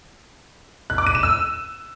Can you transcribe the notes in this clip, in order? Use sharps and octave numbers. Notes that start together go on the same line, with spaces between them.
F#6
D6
D#7
E7
E6